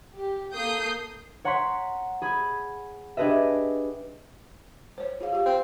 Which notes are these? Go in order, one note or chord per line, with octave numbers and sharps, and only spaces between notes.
G4
A#3 A4 D#6 G6 C7
C#5 F#5 A#5 C6 C#6 B6
G#4 B5 G#6
D4 G4 G#4 B4 D#5 E5
C5 C#5
F4 G#4 F5
G4 F5
C4